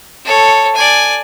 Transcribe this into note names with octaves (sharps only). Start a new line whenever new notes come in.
A4 C#5
D5 G#5